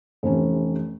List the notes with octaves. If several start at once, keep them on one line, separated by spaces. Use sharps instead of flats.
F1 C3 E3 C#4